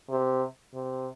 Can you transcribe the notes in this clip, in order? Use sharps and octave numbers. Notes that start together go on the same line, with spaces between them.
C3
C3